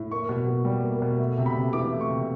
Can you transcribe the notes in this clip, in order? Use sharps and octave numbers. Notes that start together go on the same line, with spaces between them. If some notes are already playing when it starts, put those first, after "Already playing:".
Already playing: A2
A#3 C#6
B2
B2
G3
A#3
B2
A3
C3
B5
C3
E3 D6
A3
C#6
C3